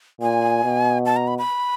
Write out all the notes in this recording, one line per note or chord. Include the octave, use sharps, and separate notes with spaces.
A#2 G#5
B2
A5
A#5
B5
B5